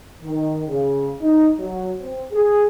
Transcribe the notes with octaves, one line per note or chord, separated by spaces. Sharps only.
D#3
C#3
D#4
F#3
C4
G#4